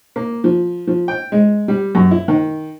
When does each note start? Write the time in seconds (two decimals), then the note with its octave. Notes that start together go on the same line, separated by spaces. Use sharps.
0.16 A#3
0.44 F3
0.87 F3
1.08 G5
1.32 G#3
1.68 G3
1.95 F#2
2.11 E4
2.28 D#3